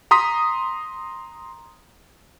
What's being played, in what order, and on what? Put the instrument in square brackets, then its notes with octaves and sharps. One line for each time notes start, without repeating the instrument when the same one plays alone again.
[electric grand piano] A#5 C6 D#6 B6